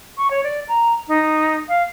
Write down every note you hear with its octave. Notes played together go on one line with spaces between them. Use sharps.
C#6
C#5
D5
A#5
D#4
F5